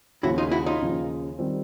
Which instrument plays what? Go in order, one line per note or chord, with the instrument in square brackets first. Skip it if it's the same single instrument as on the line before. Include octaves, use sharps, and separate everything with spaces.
[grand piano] D#2 C#3 F3 [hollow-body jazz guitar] E4 F#4
[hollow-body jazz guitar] D#4 F4
E4 F#4
D#4 F4
[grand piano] D#2 C#3 F3
D#3 G3 C4 F4